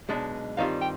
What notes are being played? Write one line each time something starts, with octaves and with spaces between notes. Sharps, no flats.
B1 B2 G#3 D4
G2 D#3 G3 C4 F4 F5
G5